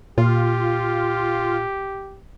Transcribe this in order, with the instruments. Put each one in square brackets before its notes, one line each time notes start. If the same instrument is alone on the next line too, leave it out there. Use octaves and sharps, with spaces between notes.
[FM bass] A#2 [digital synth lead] F4 [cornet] G4